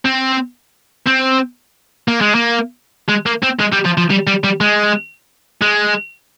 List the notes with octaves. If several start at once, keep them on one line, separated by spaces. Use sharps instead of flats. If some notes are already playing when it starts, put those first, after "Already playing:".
C4
C4
A#3
G#3
A#3
G#3
A#3
C4
G#3
G3
F3
F3
G3
G3
G3
G#3
G#3